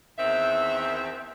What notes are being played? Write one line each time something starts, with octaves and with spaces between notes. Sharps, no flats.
E2 D#3 C4 E5